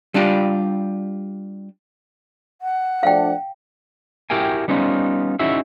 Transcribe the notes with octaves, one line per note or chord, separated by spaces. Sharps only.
G3 D4 F4 G4
F#5
F3 A3 D4 F5 G5
E4 F#4 G4 A#4 G5 G#5
G3 B3 C#4 D#4 F4
C#4 D#4 E4 F#4 G#4 E5